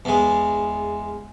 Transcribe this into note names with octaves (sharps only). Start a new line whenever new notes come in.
E2 G#3